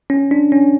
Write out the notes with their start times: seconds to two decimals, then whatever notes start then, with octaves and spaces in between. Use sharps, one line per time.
0.10 C#4
0.31 D4
0.52 C#4